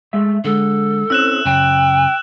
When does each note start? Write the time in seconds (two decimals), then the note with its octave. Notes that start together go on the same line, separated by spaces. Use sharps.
0.13 G#3 A3 E5
0.44 D3 G#3 A4
1.10 C4 C#4 E4 E6 F#6 E7
1.45 F#2 C#3 G5